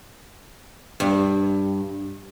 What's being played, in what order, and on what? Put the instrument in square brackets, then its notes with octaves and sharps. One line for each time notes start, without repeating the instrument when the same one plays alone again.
[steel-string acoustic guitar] G2